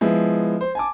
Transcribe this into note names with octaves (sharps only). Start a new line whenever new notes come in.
F3 G#3 B3 E4
C5
G#5 A5 D6